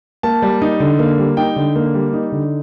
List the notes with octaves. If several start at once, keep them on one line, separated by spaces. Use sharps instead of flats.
A#3 A5
G3
D#4
D3
A#3
G3
D#4 G5
D3
A#3
G3
D#4
D3